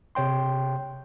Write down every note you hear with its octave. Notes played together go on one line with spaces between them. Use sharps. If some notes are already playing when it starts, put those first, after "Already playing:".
C3 C#5 G5 C6